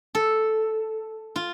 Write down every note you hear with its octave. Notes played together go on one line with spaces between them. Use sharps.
A4
F4